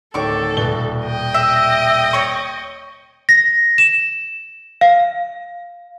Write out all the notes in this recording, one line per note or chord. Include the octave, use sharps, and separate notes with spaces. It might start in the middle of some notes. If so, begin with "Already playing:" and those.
D1 D#3 A4 C#5 C#6 D6
D#1 B2 G7
D#5 G5
E5
C#5 C#6
A#6
E7
F5